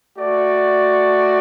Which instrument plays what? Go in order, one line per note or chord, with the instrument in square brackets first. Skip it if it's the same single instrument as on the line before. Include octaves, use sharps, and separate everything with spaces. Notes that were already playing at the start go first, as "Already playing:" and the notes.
[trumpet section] A3 F#4 D5